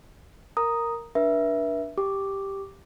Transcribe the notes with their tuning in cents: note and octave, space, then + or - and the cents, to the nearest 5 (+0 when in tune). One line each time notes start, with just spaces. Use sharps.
A#4 -5 A#5 +0 D#6 -5
D4 +0 B4 -40 E5 +0
G4 +0 D6 +0